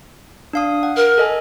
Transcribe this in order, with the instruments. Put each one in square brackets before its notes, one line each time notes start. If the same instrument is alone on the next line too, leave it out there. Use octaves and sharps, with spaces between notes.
[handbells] D4 F5 D#6
F#5
[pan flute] A#4
[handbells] A4 D#5 G#5